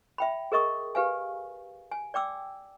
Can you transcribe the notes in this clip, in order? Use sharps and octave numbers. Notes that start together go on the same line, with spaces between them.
E5 G5 B5
G#4 A#4 D#5 C#6 D#6
G4 B4 F5 G#5
G#5
D5 G5 D6 E6